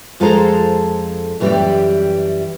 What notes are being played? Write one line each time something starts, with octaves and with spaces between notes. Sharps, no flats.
F2 G#3 F4 A4 C5 A#5
F#2 E3 G3 D#4 G4 D5